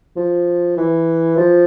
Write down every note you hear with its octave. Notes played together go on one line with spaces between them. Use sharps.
F3
E3
F3